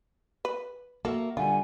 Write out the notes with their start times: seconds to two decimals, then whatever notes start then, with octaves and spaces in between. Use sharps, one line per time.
0.45 B4
1.05 A#3 F#4 A4 E5
1.37 D3 G3 F4 F#5 G#5